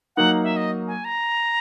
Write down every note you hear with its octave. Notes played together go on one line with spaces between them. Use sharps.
F#3 A#3 D#4 F#5
E5
D#5
G#5
A#5